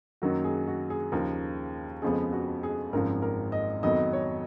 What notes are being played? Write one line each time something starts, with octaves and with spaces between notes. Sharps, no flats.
F#2 D#3 F#3 A#3 F#4
G#4
F#4
G#4
D#2 C#3 F3 A#3 A#4
F2 C#3 F3 G#3 B3 G#4
F#4
G#4
G#1 F#2 C#3 F3 A#4
A#4
D#5
F2 D#3 F#3 B3 D#5
C#5